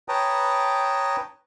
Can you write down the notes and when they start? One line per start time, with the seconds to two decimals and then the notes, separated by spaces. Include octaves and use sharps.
0.08 B4 C#5 G5 A5 A#5 D#6